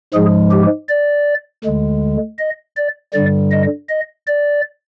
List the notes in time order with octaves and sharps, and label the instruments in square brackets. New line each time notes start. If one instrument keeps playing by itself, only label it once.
[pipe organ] G#2 F3 G#3 G#4
G4
D5
D2 D3 G#3
D#5
D5
G2 D3 G3 D5
D#5
D#5
D5